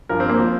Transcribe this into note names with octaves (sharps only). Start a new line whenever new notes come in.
G2 F3 A#4
C4
A#3
F3 C4